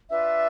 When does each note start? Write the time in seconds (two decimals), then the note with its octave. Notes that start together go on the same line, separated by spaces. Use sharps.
0.10 D4 F4 B4 E5